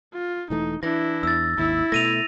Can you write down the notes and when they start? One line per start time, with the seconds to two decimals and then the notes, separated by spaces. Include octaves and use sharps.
0.14 F4
0.50 E1 E3 A3 D#4
0.83 E3 D4 E4 A#6
1.23 E2 E6 A6
1.58 G#1 D#2 E4
1.92 B2 A3 A#6 D#7 F7